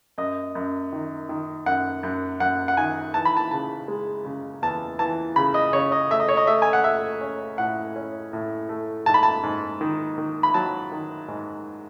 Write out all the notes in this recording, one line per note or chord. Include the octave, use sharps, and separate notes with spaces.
F#2 D#5
F#2
D#3
D#3
F#2 F#5
F#2
F#2 F#5
F#5
D#3 G#5
E3 A5
B5
A5
C#3 A5
G#3
C#3
E2 A5
E3 A5
C#3 B5
D#5
C#3 C#5
D#5
A3 E5
D#5
C#5
D#5
A3 E5
G#5
F#5
A3 E5
C#4
A2 F#5
C#4
A2
A3
G#2 A5
B5
A5
G#2
D#3
D#3
B5
F#3 A5
D#3
G#2